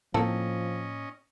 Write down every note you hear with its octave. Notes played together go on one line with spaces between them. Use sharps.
A2 F3 A#3 C4 C#4 A4 D#5